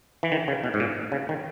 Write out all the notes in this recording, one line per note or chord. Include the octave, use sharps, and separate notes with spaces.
E3
D#3
C#3
B2
G#2
A#2
C#3
D#3